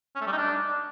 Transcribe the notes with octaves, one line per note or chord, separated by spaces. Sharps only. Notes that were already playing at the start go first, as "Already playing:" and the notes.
C#4
A3
G3
D#4
D4